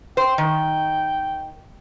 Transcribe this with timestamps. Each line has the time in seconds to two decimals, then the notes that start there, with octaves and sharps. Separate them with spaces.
0.17 C5 G5
0.38 D#3